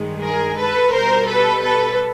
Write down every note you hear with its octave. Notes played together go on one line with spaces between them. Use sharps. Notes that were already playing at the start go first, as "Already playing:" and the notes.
Already playing: G2 D#3 G#3
G#4 A#4
A4 B4
B2 G3 A#4 C5
A4 B4
A4 B4